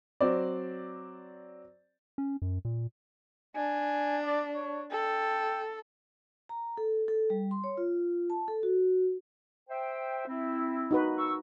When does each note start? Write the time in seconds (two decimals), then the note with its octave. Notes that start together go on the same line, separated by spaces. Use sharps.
0.21 F#3 C4 D5
2.18 C#4
2.42 F#2
2.65 A#2
3.56 D4 G#5
4.25 D5
4.55 C#5
4.92 A4 G5
6.49 A#5
6.77 A4
7.08 A4
7.30 G3
7.51 C6
7.64 C#5
7.77 F4
8.30 A5
8.48 A4
8.63 F#4
9.69 C5 E5 G5
10.28 C4 E4
10.91 D#4 F#4 B4
11.18 C#6 E6